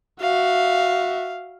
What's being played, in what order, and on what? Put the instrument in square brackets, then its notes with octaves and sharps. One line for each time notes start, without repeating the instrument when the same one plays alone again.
[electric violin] F#4 E5 [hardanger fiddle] F5